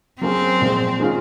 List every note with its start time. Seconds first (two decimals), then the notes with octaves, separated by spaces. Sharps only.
0.21 F#3 A#3 C4 C#4 G#4
0.61 A#2 F3 G#3
1.00 D#3 G#3 C#4 F4